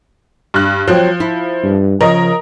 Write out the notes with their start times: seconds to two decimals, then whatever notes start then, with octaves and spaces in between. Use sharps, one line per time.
0.54 G2 F#6
0.88 F3 F#3 C4
1.20 E4
1.63 G2
2.01 C#3 F3 A#4 D#5